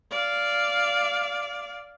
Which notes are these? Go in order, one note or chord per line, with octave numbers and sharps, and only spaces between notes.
D5 F5